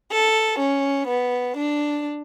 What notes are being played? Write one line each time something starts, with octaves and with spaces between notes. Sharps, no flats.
A4
C#4
B3
D4